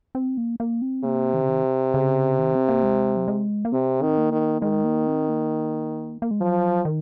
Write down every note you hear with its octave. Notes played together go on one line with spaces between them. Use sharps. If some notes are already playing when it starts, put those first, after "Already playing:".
C4
A#3
A#3
C4
C3 A#3
D#3
C#3
D#3
C#3
D#3
C4
A#3
G#3
F#3
G#3
A#3
C3 C4
D#3
A#3
D#3
D#3 G#3
A#3
C4
A#3
A#3
G#3
F3 F#3
D#3